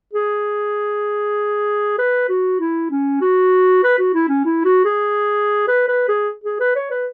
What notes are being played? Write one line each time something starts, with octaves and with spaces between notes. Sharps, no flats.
G#4
B4
F#4
E4
C#4
F#4
B4
F#4
E4
C#4
E4
F#4
G#4
B4
B4
G#4
G#4
B4
C#5
B4